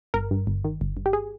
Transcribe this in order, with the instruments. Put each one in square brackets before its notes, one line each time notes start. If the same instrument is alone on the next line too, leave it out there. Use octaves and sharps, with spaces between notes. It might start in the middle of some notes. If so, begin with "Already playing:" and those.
[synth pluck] G1 A#4
G2
G1
D#3
G1
G2
G4
G#4